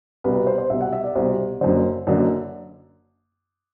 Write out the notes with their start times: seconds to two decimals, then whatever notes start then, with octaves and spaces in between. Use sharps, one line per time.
0.24 C2 B2 B4
0.35 B4
0.47 C5
0.58 C5
0.70 C2 B2 E5
0.81 F#5
0.93 E5
1.04 D5
1.15 C2 B2 C5
1.61 F#1 F#2 D3 C5
2.07 F#1 F#2 D3